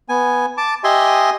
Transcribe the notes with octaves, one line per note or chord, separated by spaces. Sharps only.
B3 G#5
A5 D6
G4 D#5 E5 G#5 C6